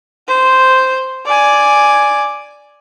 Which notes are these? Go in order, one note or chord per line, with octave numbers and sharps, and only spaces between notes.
C5
D5 G#5